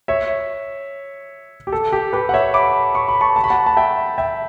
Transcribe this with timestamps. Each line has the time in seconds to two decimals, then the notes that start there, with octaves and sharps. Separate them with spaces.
0.08 C#5 E5
1.67 G4
1.72 A4
1.93 G4
2.13 G4 B4
2.29 F#5
2.34 C#5 E5
2.54 B5 D6
2.95 C#6
3.09 B5
3.21 A5 C#6
3.36 A5
3.44 B5
3.50 F#5 A5
3.66 A5
3.77 E5 G5
4.18 E5 G5